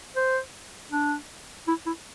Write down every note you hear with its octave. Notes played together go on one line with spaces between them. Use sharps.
C5
D4
E4
E4